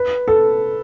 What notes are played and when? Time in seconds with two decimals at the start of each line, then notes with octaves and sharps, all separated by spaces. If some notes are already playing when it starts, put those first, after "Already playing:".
Already playing: B4
0.28 A4